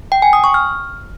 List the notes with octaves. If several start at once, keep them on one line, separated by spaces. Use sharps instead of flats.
G5
G#5
D#6
C#6
F6